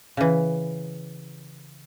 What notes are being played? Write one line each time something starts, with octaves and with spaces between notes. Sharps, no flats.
C#3 E3